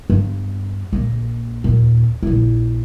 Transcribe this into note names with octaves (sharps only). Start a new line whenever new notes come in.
G2 B3
A#1 A#3
D#2 A#2
A#1 E4